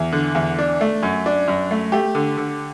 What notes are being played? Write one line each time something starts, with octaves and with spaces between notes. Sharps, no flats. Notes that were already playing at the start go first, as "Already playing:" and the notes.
Already playing: E2
D3
E2
D4
A3
F#2
D4
F#2
A3
A3 G4
D3
D3